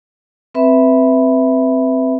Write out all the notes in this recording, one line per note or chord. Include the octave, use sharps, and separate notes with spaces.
C4 B4 E5 B5